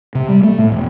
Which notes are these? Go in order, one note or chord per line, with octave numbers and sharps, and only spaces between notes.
C3
G3
A3
A2
E1